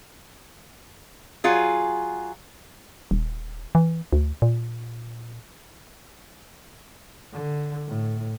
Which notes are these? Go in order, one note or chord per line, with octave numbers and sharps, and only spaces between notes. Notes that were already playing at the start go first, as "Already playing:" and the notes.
F#3 F4 G#4
D#1
E3
D2
A#2
D3
A2